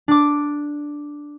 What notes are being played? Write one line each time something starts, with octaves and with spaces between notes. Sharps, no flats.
D4 D6